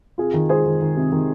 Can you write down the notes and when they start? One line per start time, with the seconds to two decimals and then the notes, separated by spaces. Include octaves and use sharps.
0.18 C3 F4 G#4
0.34 D#3
0.49 G#3 G#4 C5
0.66 D#3
0.81 D#3
0.97 C3
1.12 D#3